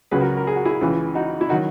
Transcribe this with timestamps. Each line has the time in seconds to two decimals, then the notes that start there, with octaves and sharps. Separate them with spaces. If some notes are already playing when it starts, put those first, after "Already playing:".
0.11 C#2 C#3 F#3 G#4 B4
0.21 F#4 A#4
0.37 A#4
0.47 G#4
0.56 F#4
0.65 E4 G#4
0.81 C#2 C#3 E3
1.15 D#4 F#4
1.41 E4
1.49 D#3 F#3 D#4 F#4